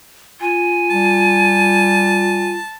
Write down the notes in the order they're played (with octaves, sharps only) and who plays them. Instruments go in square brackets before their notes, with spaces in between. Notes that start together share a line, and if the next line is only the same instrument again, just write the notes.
[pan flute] F4 [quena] G#5
[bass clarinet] G3 [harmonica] A5